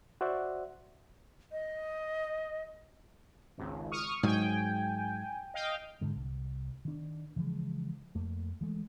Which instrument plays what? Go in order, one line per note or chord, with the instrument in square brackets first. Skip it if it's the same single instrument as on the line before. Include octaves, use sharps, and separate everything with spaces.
[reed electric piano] F#4 C5 D5 E5 F#5
[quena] D#5
[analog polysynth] G#1 C#2
C#6 D#6 F6
[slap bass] G#2 F#3 [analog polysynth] G5 G#5
[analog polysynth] D#5 F5 G5
[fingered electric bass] G#2 D3 G#3
C2
D#3 D4
C#3 E3 F3 G#3
F2 A3 A#3
E3 G#3 A3